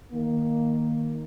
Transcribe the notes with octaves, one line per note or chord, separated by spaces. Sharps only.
D#3 A#3